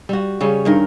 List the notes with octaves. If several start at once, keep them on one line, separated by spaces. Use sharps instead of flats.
G3 F#4
C#3 G3 C#4
G2 D#3 A#4